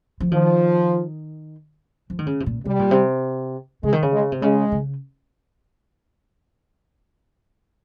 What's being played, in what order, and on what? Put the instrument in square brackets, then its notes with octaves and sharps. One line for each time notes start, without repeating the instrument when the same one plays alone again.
[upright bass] F3
[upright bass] D#3 [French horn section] F3
[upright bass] F3
D#3
C#3
C3
A#2
[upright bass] C3 [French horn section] G3
[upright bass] A#2
C3
[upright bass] C#3 [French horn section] G#3
[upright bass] D#3
C#3
[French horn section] G#3
[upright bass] C3
[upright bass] C#3 [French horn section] G#3
[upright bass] C#3